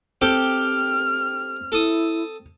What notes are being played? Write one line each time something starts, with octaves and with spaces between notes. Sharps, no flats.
C4 G4 A4 G5 F6
E4 A4 D#6